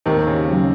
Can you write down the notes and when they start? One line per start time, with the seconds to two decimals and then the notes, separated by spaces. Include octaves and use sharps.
0.06 D#2 C3 D#3
0.27 C#3
0.48 C#3 F#3